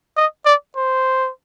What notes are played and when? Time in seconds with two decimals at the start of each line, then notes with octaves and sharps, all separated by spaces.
0.17 D#5
0.46 D5
0.76 C5